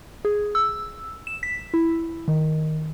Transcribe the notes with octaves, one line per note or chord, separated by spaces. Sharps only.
G#4
E6
E7
B6
E4
D#3